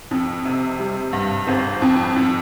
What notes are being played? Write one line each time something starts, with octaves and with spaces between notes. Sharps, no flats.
F2
C3
G3
G2
G1 C4
F2
F2